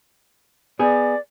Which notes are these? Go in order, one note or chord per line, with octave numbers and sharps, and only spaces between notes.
B3 G#4 D5